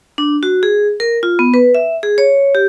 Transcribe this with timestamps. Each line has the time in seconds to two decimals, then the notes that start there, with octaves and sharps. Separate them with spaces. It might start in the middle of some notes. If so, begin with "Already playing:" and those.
0.18 D4
0.43 F#4
0.63 G#4
1.00 A#4
1.23 F4
1.39 B3
1.54 B4
1.75 E5
2.03 G#4
2.18 C#5
2.55 G4